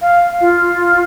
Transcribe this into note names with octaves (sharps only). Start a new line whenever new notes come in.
F5
F4